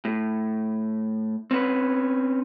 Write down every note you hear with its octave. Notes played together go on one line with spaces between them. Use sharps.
A2
C4 C#4 B4